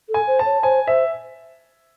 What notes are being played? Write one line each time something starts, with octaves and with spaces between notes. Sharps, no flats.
A4
G#5
C5
A5
C#5
C5 G#5
C5 E5